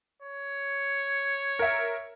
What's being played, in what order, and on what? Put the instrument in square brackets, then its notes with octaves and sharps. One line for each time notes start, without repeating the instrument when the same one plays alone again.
[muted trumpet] C#5
[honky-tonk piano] A#4 E5